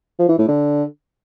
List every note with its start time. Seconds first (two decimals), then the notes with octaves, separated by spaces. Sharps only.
0.19 F3
0.29 E3
0.38 A2
0.48 D3